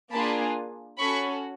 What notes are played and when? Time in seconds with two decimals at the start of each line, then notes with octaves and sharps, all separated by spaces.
0.12 A#3 D4 F4 G#4 A5 B5
0.99 C#4 F#4 A4 B5 C#6